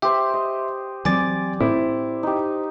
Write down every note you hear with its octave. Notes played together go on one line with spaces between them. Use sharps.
G4 C5 E5
D#5
E3 F#3 C4 D5 G#5 D6 A6
A2 C4 E4 C5
D#4 G4